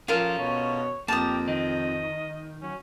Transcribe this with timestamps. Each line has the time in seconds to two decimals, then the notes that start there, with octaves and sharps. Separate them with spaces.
0.08 F3 C#4 F4 A4 A#4
0.38 B2 C#5
1.08 F2 A#3 G4 A5 D#6
1.48 D#3 D#5
2.62 F#3 C#4